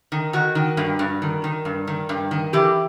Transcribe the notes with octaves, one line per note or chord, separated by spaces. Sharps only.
D#3
D#3 F#4
D#3
G2
G2
D#3
D#3
G2
D#3
G2
D#3
E3 G4